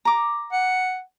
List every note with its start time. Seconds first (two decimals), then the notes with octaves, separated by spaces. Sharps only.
0.05 A#5 D6
0.53 F#5